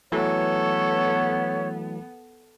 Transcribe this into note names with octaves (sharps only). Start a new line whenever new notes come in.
E3 F#3 A3 B3 A4 C#5